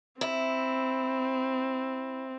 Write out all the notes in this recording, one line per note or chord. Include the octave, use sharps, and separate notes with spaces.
C4 E4